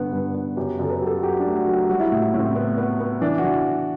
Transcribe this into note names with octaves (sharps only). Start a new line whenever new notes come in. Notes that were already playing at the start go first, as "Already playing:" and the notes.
Already playing: G2 D3 B3
G2
B3
F#2 G4
F#2 A4
B4
F#3 G4 A4
F#4
F#3 G4
D4
A3
F#4
F#3
G4
G3 F#4
E4
F#4
A2
E4
A2
C4
B3
B3
B3
E3 D4
F#4
E3